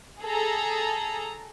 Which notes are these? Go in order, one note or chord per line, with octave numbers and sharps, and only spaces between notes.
G#4 A4 A#5